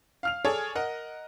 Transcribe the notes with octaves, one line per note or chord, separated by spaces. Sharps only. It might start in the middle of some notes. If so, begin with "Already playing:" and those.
F5 F6 F7
G#4 A4 C#5 D5 G#5
A#4 D#5 F#5